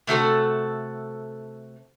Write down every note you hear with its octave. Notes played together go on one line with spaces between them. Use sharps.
C3 A3 F#4 A4